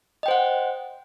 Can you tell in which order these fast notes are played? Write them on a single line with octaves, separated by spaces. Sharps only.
D#5 G5 C5 F#5